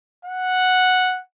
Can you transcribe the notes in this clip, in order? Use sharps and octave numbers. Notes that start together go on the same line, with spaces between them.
F#5